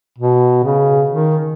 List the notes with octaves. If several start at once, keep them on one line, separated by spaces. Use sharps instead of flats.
B2
C#3
D#3